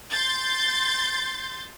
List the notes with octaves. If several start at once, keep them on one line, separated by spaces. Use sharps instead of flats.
C6 G6 A6